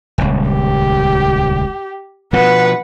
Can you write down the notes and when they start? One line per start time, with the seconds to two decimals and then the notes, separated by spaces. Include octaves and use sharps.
0.18 D#1 C#2
0.51 G4
2.33 B2 F3 B4 F#5